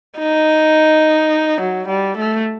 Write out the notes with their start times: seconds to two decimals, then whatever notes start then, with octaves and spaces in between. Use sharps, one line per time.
0.19 D#4
1.61 F#3
1.88 G3
2.17 A3